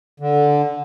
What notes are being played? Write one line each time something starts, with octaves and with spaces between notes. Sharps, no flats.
D3